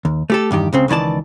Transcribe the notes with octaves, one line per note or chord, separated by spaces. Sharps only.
D#2
A3 G4 A4
E2 G2 D#3 G4
C#2 C#3 C4
C#2 D#3 E3 D5 A5